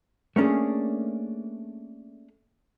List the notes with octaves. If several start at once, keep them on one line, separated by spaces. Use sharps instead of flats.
A3 A#3 C#4 D4 G#4